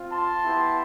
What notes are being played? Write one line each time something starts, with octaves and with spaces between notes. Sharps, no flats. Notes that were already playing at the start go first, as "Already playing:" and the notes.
Already playing: C4 F4
A5 C6
B3 E4 G4